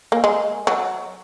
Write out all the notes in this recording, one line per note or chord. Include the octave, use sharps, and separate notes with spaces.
A#3
G#3
F#3